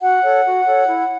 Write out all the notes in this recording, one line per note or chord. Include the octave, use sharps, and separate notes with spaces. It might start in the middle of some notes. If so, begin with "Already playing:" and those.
F#4 F#5
A4 C#5
F#4
A4 C#5
E4